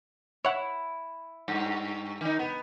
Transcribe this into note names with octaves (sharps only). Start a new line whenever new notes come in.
E4 C#5 F#5
G2
D#3 D#4
B3